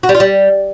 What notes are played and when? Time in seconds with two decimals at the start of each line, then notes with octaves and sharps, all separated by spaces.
0.03 F#4
0.09 G3
0.14 F4
0.20 G3